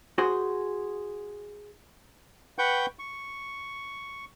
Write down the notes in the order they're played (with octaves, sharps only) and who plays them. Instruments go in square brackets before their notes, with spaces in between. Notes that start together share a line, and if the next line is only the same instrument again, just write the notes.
[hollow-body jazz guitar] F#4 G#4 C5
[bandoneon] B4 F#5 G5 C#6 G6
C#6